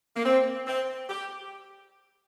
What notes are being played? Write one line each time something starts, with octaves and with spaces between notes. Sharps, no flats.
A#3
C4
C4
G4